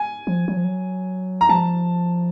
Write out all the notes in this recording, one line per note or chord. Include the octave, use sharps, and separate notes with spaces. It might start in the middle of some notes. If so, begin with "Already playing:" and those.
Already playing: G#5
F3
F#3
F3
F#3
A#5
F3 A5